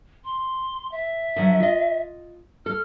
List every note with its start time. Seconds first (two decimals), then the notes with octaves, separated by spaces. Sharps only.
0.25 C6
0.92 E5
1.36 D3 F3 F#3
1.60 F4 D#5
2.66 A4 F6